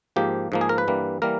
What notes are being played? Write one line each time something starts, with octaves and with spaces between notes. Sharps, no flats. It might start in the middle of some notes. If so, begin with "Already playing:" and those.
G#2 F3 A#3 G4
G#2 F3 A#3
G#4
A#4
B4
G2 E3 G3 A#3
E3 G3 A#3 A#4